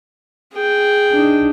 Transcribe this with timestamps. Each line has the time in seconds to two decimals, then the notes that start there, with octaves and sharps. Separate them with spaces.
0.53 G#4 G5
1.11 D4 D#4